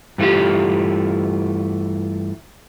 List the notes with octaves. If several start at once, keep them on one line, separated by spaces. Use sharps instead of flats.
G2 E3 A3 F4 G4